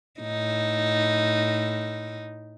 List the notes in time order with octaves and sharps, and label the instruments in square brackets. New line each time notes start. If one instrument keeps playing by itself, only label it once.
[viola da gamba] A2 D#4